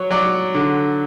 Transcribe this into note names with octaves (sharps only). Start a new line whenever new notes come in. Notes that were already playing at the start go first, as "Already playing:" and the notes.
Already playing: F#3 C#5
F#3 D5
D3